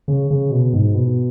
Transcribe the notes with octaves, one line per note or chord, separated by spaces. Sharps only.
C#3
C#3
B2
G#2
B2